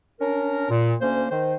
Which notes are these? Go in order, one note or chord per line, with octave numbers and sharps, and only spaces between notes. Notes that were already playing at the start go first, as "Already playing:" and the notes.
C#4 D4 A#4
A#2
D2 A#3 C#4 C5
D#3 C5